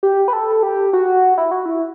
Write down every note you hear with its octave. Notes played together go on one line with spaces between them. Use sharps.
G4
B4
A4
G4
F#4
E4
F#4
E4